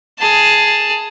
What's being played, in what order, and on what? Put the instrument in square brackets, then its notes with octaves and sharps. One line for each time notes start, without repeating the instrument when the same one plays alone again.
[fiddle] G#4 A5